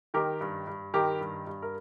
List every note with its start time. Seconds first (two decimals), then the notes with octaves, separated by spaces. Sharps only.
0.14 D#3 G4 A#4
0.41 G2
0.67 G2
0.94 D#3 G4 A#4
1.20 G2
1.47 G2
1.62 A#4